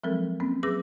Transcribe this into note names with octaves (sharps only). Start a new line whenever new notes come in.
F3 F#3 G#3 C4 A4 A#4
A#3 C4 C#4
F#3 G#4 B4 D6 E6 A#6